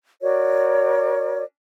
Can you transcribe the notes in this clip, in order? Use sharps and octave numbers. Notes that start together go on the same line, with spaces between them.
F#4 A#4 C#5 D5